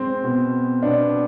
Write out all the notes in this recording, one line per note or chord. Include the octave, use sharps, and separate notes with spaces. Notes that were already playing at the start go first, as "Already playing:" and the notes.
Already playing: G#3 C4
B2 B3
B2 B3 D4